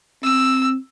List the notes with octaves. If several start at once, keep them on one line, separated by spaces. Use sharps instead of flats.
C4 E6